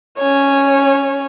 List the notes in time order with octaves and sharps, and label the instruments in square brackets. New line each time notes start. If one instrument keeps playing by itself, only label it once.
[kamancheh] C#4 C#5